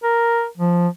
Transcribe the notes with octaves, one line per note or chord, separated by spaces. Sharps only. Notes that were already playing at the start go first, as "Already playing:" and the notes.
A#4
F3